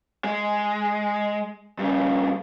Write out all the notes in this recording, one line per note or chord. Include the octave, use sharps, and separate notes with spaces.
G#3
G2 C#3